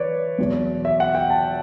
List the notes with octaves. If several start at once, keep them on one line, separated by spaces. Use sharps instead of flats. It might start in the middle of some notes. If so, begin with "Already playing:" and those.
Already playing: E3 B4 C#5 D5
E2 B2 F#3
E5
F#5
G5
A5